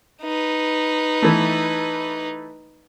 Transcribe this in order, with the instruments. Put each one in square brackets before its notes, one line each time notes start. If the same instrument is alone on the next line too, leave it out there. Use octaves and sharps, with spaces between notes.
[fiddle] D#4 B4
[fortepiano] E3 A3